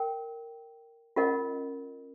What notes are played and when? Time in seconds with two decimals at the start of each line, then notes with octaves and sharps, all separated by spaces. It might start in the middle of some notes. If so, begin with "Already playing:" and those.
Already playing: A#4 G5
1.16 C#4 F4 A#4 D#5 F#5